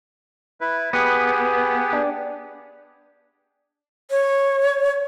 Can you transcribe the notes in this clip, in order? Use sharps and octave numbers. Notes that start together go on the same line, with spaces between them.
E4 B4
B3 G4 G#4 B4
D4
C#5